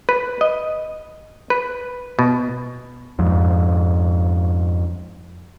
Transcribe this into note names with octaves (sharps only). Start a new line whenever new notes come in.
B4
D#5
B4
B2
F2 G#2